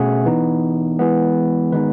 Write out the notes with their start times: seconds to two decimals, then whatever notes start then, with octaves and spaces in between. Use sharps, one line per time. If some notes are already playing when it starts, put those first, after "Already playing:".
Already playing: B2 A3 C#4 G#4 E5 F#5
0.26 E3 B3 D#4
0.99 E3 G#3 B3
1.72 D#3 G#3 B3 D#4 B4